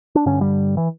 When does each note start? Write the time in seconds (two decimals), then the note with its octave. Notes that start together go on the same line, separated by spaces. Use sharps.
0.15 D4
0.26 G2 D3 C#4
0.41 G3
0.77 E3